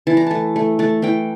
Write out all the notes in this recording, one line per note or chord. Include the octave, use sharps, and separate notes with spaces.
E3 A5
A#5
A3 A5
A3
A3 A5
E3 G5